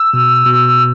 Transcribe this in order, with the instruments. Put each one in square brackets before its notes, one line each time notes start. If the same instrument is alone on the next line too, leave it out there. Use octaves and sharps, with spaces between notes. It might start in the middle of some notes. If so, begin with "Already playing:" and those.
Already playing: [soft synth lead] E6
[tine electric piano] B2
B2